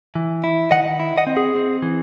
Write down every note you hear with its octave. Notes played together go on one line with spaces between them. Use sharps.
E3
E4
D#3 D#5 F#5
E4
D#5 F#5
C4
G#4
C4
E3